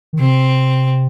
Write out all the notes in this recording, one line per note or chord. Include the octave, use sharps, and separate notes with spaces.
D#3
C3 C4